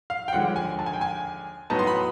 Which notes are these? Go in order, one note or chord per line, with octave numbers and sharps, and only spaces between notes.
F5
G5
D#2 D3 F3 G#3 F#5
G#5
A5
G#5
G5
G#5
A2 F#3 B3 D#4 A5
C6
B5